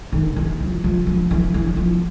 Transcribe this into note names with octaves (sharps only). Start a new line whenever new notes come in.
D#3
E3
F3
F3
F3
E3
E3
F3